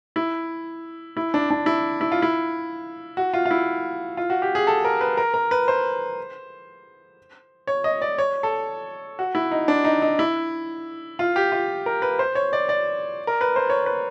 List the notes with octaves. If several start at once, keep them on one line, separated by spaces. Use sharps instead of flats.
E4
E4
D4
D4
E4
E4
F4
E4
F#4
F4
F4
E4
F4
F#4
G4
G#4
A4
A#4
B4
A#4
A#4
B4
C5
C#5
D#5
D5
C#5
A4
F#4
E4
D#4
D4
D#4
D#4
E4
F4
G4
F4
A#4
B4
C5
C#5
D5
D5
A#4
B4
C5
C#5
B4